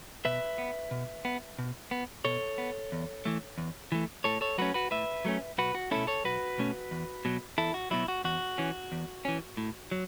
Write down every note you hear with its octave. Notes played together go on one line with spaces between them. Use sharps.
B2 B4 E5
B3
B2
B3
B2
B3
B2 A4 C#5
B3
E2
E3 A3
E2
E3 A3
A2 A4 C#5
A4 C#5
F#3 A3 C#4 F#4 B4
F#4 B4
A2 B4 E5
F#3 A3 C#4
B1 F#4 B4
F#4
B2 A3 C#4 E4 A4
A4 C#5
B1 F#4 B4
B2 A3 C#4
E2
B2 F#3
E2 E4 A4
F#4
B2 F#3 E4
F#4
E2 F#4
E3 C#4
E2
E3 C#4
A2
F#3